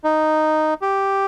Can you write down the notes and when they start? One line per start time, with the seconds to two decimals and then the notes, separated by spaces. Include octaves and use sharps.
0.04 D#4
0.82 G4